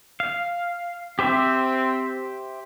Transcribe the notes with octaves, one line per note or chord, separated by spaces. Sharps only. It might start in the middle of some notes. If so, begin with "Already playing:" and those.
F5
C4 G4 C5 E5